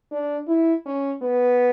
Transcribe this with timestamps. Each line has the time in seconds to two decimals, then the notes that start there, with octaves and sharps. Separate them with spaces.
0.11 D4
0.48 E4
0.86 C#4
1.22 B3